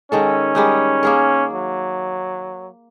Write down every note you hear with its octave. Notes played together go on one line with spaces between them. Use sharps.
D#3 G#3 C#4 A4
G3 G#3 D#4
A#3 G#4 A#4
F#3